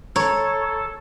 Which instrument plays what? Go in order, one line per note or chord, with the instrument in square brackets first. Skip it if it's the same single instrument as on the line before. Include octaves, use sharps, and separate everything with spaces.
[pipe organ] A4 [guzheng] C#5 [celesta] A#5